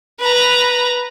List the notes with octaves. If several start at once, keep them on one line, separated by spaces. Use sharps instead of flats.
B4 A#5